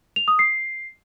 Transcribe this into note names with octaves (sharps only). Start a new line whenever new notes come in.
F7
D#6
C7